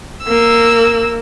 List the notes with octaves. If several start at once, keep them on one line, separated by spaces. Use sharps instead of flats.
A#3 E6